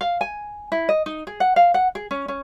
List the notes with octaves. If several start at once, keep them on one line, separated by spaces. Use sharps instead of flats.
F5
G#5
E4
D#5
D#4
G#4
F#5
F5
F#5
G#4
C#4
C#4